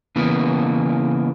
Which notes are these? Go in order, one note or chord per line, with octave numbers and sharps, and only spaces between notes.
C#3 E3 A#3 B3